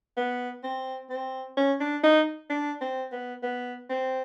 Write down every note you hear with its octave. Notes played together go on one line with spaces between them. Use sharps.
B3
C4
C4
C#4
D4
D#4
D4
C4
B3
B3
C4